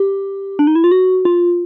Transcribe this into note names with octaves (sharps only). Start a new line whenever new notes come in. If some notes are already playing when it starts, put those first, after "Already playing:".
Already playing: G4
D4
D#4
E4
F4
F#4
F4